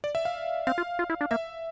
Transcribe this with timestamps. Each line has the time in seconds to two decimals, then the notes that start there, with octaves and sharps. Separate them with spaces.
0.04 D5
0.15 E5
0.25 F5
0.67 C4 F5
0.78 F4
0.99 F4
1.10 E4
1.21 D4
1.31 A#3 E5